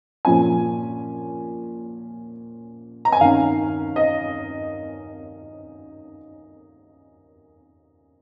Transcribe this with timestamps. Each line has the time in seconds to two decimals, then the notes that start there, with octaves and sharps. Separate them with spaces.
0.25 A#2 F3 C#4 G#5
3.05 A#5
3.12 G#5
3.21 D#3 C#4 F5
3.96 D#5